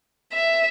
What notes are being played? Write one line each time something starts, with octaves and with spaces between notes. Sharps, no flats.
E5